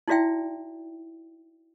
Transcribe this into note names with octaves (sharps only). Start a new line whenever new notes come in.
D#4 E4 F#4 D5 E5 G5